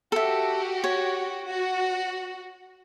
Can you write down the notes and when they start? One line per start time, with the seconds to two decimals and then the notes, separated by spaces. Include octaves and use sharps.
0.12 F#4 G4 A4 E5
0.84 C#5
1.46 F#4